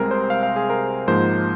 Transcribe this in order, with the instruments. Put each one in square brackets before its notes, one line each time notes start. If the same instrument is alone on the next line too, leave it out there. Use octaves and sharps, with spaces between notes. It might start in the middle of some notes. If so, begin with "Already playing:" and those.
Already playing: [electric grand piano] C2 C3 G#3 C4 G#4 A#4
C5
F5
F5
G#4
A#4
G#2 F3 A#3 C5